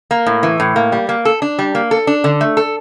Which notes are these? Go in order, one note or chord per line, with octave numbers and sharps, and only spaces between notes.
A#3
A2
E3
A2
A#3
G3
A#3
A4
D4
G3
A#3
A4
D4
D3
A3
A4